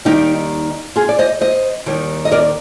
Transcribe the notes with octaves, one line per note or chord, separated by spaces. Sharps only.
D#2 D#3 G3 D#4 G4
F4 G#4
D5
C5 D#5
C5 D#5
D#2 D#3 G3
D#5
A#4 D5